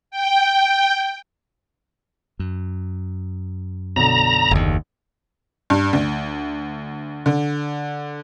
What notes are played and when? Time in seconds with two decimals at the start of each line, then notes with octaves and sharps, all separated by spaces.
0.11 G5
2.39 F#2
3.96 B1 D3 A#5
4.51 F#1 D#2
5.70 G2
5.93 D2
7.26 D3